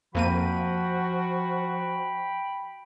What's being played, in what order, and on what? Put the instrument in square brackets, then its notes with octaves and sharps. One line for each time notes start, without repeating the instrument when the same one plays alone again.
[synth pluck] F2 A#3 D#7 [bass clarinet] F3 [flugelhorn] F#4 [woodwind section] G5 B5